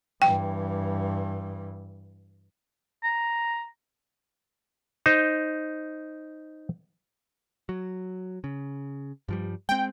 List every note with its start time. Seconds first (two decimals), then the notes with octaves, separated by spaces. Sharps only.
0.22 G2 E3 G5
3.04 A#5
5.06 D#4 C5
7.69 F#3
8.44 C#3
9.29 G2 F3 G3
9.69 G#3 C4 G5